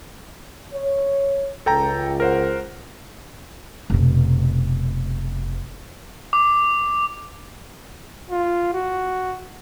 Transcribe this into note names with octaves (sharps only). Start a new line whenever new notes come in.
C#5
C#2 A4 G5 A#5
A#4 C5 F#5
F1 B2
D6
F4
F#4